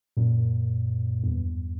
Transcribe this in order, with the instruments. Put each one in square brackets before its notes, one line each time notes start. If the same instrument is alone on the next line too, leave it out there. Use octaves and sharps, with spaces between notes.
[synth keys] F#2 A#2
E2 G2